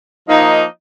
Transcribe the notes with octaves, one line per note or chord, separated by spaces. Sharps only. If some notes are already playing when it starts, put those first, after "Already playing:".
F3 A#3 D#4